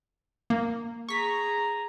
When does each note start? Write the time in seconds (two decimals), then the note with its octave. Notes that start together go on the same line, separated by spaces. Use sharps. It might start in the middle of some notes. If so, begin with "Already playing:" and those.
0.50 A#3
1.09 G#4 A#5 C#6 B6